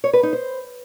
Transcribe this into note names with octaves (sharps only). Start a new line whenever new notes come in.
C#5
B4
D#4
C5